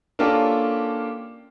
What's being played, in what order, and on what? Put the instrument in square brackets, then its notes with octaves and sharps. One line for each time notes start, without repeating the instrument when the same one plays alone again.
[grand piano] A#3 C#4 D4 F4 G4 A4